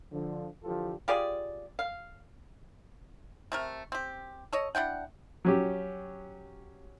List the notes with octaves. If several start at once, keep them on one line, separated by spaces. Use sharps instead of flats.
D3 F3
D3 E3 F3 F4 G4 A4
F4 G4 G#4 D5
F5
C3 A3 A#4
C4 G4
A4 C#5 D#5
D4 E4 F#5 G5
F#3 C#4 G4